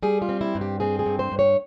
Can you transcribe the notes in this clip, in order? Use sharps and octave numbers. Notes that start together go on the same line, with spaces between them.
G3 G#4
F4
C4
E4
G2
G4
C4 G#4
G#4
G2
C5
G2
C#5